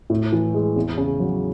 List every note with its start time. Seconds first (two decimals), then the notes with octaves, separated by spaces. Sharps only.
0.10 A2
0.32 E3
0.54 G#3
0.76 E2
0.98 C#3
1.20 F#3